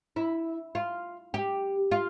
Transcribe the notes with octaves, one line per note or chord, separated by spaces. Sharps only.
E4
F4
G4
F4